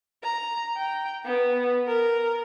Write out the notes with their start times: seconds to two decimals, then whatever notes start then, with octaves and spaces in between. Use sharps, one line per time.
0.23 A#5
0.77 G5
1.25 B3
1.87 A#4